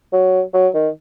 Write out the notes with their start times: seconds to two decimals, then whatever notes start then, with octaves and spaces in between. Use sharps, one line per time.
0.13 F#3
0.54 F#3
0.74 D#3